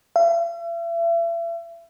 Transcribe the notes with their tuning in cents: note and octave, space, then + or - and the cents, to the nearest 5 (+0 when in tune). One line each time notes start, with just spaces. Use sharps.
E5 +40